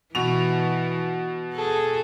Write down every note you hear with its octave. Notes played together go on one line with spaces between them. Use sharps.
B2 E3 F7
G#4 A4